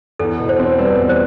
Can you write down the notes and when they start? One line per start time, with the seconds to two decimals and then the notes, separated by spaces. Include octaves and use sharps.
0.19 E2 A4
0.40 B2
0.49 C5
0.59 C4
0.79 G3 B4
0.99 E2
1.09 C5